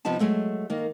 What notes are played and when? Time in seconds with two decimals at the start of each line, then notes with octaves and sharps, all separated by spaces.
0.05 C3 F3 B3 D#4 A5
0.20 F#3 G#3 A3
0.70 D#3 A#3